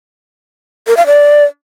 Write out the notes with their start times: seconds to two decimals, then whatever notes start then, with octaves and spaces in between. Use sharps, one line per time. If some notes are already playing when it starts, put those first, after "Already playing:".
0.87 A#4
0.97 F5
1.06 D5